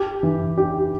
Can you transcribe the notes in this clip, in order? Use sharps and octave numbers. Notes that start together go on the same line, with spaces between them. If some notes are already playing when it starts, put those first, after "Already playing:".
Already playing: G4
E3
G4